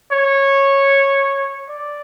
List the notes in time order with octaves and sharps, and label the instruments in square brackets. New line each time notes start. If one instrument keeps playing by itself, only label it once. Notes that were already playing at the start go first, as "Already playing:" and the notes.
[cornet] C#5
D5